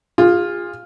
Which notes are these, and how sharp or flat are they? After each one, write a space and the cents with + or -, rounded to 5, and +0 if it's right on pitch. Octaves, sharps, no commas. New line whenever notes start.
F4 +10 G#4 -30